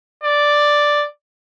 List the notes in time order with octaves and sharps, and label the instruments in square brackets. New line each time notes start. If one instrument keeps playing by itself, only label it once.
[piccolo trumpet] D5